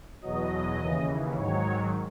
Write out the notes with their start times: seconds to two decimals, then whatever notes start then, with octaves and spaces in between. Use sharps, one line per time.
0.21 E2 B2 F#3 D#5
0.79 D#2 C#3 E3
1.36 G#2 D#3 F#3 C#5